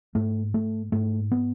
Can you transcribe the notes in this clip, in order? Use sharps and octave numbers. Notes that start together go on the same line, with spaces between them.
G#2 A3
A3
G#2 A3
B3